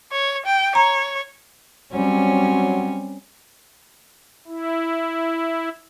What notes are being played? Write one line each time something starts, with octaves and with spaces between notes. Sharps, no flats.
C#5
G5
C#5 A#5
F#3 G3 C4 C#4
E4